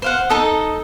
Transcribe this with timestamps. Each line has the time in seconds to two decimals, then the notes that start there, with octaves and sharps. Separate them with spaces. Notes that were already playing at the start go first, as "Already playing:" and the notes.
0.02 C5 F5 F#5
0.30 D#4 A4 D#5